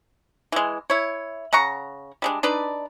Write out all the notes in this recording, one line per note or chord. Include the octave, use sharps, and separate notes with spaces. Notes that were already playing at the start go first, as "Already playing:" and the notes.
E3 G#3
E4 C#5
C#3 F#5 A#5 C#6
G3 G#3 D4
D4 D#4 B4 D5